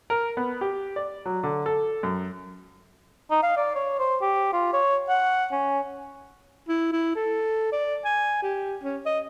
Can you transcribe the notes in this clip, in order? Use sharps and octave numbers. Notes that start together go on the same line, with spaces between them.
A#4
B3
G4
D5
F#3
D3
A4
F#2
D#4
F5
D5
C#5
C5
G4
F4
C#5
F#5
C#4
E4
E4
A4
D5
G#5
G4
C#4
D#5